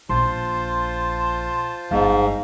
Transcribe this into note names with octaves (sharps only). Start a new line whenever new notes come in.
A#1 F4 C5 A5 C6
G1 G#2 F5